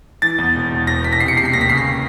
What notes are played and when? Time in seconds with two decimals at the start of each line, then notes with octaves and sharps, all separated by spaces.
0.22 E3 A6
0.38 E2
0.55 E1
0.71 E1
0.87 E1 A#6
1.04 E1 B6
1.13 A#6
1.20 C3 C7
1.28 C#7
1.36 C3 C7
1.45 B6
1.53 D#2 A#6
1.61 B6
1.69 C#3 C7
1.78 B6